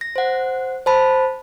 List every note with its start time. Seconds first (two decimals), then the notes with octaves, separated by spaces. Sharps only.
0.01 A#6
0.16 C5 F#5
0.86 C5 A5 B5